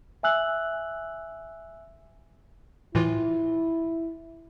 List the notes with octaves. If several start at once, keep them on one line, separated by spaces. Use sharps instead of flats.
E5 G#5 E6 F#6 F#7
A2 E3 E4 F4